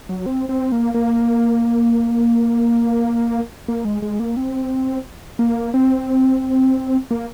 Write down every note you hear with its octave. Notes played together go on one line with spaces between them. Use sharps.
F#3
C4
C4
A#3
A#3
A#3
G#3
G#3
A#3
C4
A#3
C4
A#3